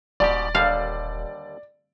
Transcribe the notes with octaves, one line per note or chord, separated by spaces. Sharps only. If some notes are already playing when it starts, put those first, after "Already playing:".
D#1 G#2 B2 G4 D5
D#2 D3 G3 F5